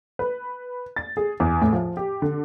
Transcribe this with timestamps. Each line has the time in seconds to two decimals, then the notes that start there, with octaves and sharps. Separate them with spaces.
0.19 B4
0.96 A6
1.17 G#4
1.40 E2
1.61 A2
1.73 F3
1.97 G4
2.22 D3